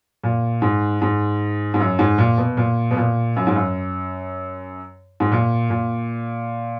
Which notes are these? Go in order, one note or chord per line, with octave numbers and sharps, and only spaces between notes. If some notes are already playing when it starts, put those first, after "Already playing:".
A#2
G#2
G#2
G#2
F#2
G#2
A#2
B2
A#2
B2
A#2
F#2
G#2
F#2
G#2
A#2
A#2